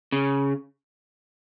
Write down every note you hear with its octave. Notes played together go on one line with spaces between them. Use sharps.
C#3